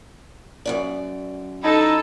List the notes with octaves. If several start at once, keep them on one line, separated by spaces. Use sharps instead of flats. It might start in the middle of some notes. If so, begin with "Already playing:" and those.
F#2 C#3 D5
D#4 E4 A4 A5